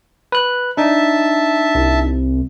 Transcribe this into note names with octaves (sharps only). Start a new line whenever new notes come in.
B4 F#6
D4 D#4 E5 A5
C2